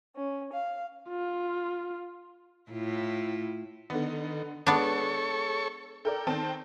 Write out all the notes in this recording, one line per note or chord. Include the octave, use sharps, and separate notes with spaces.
C#4
F5
F4
A2 E4 F4
D3 D#3 B3
G#3 B3 D4 A4 C#5 C#6
A4 A#4 D5 G5
D#3 C4 A5